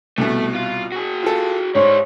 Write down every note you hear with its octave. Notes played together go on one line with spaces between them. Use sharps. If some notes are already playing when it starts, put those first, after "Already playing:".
C2 B2 A3
F4
F#4 G#4
F4 A4
G#2 G3 C5 C#5